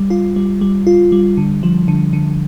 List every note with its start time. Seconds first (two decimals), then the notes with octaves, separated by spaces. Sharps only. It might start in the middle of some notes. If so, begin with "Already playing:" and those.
Already playing: G3
0.10 F4
0.36 G3
0.61 G3
0.87 F4
1.12 G3
1.37 D3
1.63 F3
1.88 D3
2.13 D3